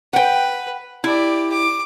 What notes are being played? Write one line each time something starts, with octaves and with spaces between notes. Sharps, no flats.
B4 F#5 G5
E4 G4 D5
D6